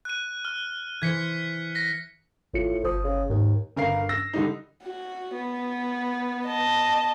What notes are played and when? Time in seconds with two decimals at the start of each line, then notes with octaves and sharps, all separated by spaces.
0.05 F#6 D#7
0.45 F6
1.02 E3 C5 G#6 B6 C#7
1.75 A#6 B6
2.54 G#1 A2 F4 C#7
2.84 G1 F3 D#6
3.04 C#3
3.30 D#2 G#2
3.76 G1 A#4 F5 C7
4.09 E6 A#6
4.33 D3 G3 D#4
4.83 F#4
5.35 B3
6.46 D#5 A5